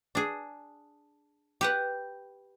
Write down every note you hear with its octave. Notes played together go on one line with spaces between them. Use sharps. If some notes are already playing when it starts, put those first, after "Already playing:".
D4 G#4
G4 B4 F#5